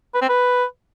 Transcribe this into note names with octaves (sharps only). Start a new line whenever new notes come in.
B4
C4
B4